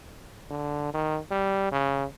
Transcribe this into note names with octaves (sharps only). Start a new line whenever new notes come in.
D3
D#3
G3
C#3